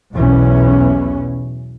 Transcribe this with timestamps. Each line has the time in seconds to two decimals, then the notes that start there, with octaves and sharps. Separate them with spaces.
0.13 B1 E2 B2 E3 C#4